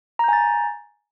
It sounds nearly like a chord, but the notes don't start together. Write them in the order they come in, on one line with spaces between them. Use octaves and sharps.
A#5 G6 G#5 A6